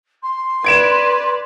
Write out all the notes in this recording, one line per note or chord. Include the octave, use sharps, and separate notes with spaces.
C6
B4 D5 G#6 D7 E7